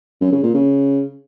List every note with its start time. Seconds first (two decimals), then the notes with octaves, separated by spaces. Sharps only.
0.21 F#2
0.32 C#3
0.43 A#2
0.54 C#3